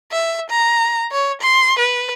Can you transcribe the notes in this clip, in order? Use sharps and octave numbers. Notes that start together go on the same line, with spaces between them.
E5
A#5
C#5
C6
B4